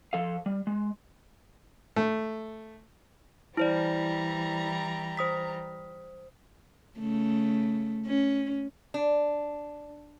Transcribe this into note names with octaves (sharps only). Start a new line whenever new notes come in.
F3 A4 F5
G3
G#3
A3
E3 G3 E4 C5 D5 A#5
C5 D#6 B6
C#3 A3
C#4
D4